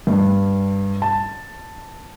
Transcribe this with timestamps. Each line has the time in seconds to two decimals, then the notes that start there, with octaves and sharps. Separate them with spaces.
0.07 G2
1.02 A5